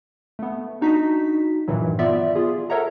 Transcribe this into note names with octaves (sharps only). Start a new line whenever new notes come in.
A3 B3
D4 D#4 F#4 B6
G2 A#2 D#3 E3 F#3
B3 F4 D5 E5
F4 G#4
A4 A#4 C#5 E5 F#5 A#5